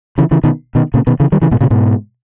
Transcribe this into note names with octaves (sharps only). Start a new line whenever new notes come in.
C#3 E3
C#3 E3
B2 D#3
B2 D#3
A#2 C#3
B2 D#3
C#3 E3
D#3 G3
C#3 E3
G#2 B2
A#2 C#3
G#2 B2